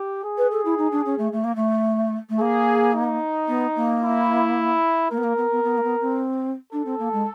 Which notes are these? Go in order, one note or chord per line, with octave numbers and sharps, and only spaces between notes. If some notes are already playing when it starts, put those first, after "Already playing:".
Already playing: G4
G#4
B4
A4
E4
D#4
D4
C#4
A3
A3
A#3
A3
A3
A#3 G#4
D#4
B3
A#3
E4
A#3 A#4
B3
A#3
B3
B3
B3
A#3
B3
C4
D4 A4
C4
A#3
G#3